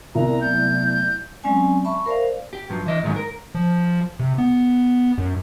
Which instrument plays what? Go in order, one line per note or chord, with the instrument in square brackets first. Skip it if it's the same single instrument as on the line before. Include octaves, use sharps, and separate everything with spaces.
[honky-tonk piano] C2 [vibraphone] B3 A#4 [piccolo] A#5
[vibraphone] F#3 A3 B3 [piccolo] G6
[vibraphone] F#3 G#3 C4 C#4 D5 G#5
E5 A5 B5 C#6
A#4 C5 D5 F5
[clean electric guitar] G4
G2 F3 F#3
E3 D#5
G#2 D#3 F#3 G#3 F4 F#4
A#4
[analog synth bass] F3
C3
B3
F#2